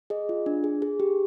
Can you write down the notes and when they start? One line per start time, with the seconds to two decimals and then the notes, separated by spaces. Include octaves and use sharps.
0.10 G#4 D#5
0.29 F4
0.46 D4
0.64 G#4
0.82 G#4
1.00 G4